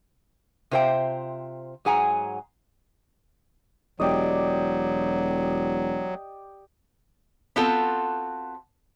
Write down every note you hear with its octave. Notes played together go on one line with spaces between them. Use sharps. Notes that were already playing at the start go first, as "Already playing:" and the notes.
C3 F4 C5 E5 G5
G#2 F#3 G#4 F#5 G#5 A#5
E1 F#3 G4 D5 D#5
B3 C4 F4 F#4 A4